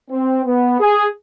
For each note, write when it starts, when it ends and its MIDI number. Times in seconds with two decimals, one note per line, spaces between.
0.11 0.42 60
0.45 0.79 59
0.80 1.08 68